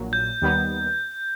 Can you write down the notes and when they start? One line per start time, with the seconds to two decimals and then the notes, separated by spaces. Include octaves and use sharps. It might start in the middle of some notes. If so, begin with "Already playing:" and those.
Already playing: A#1 A#2 F#3
0.13 G6
0.42 D#2 D#3 G3 B3 D#4